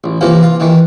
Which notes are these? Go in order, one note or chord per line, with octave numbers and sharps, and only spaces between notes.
A1
C3 E3 F3 A#3
F4
D#3 E3